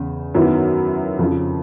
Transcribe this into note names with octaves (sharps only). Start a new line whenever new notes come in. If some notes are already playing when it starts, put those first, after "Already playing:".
Already playing: E2 C#3
F#2 D#3 F#3 B3 E4
F2 C#3 F3